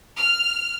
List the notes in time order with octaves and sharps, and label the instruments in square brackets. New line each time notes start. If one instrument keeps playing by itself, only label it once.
[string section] F6